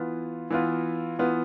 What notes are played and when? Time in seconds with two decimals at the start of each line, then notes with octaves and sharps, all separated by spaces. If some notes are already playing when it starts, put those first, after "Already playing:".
Already playing: E3 B3 F4
0.50 E3 B3 F4
1.19 E3 B3 F4